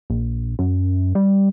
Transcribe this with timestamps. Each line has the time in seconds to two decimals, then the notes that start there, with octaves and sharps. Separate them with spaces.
0.10 A#1
0.59 F#2
1.15 G3